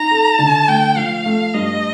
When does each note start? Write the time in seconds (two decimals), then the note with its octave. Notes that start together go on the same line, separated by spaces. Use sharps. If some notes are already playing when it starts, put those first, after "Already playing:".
Already playing: D#4 A#5
0.11 A4
0.39 D3 A5
0.67 A3 G5
0.96 F3 F5
1.26 A3
1.54 G2 D#5